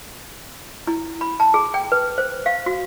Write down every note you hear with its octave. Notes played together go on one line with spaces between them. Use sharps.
E4
B5
A5
G#4
G5
B4
C5
F5
F#4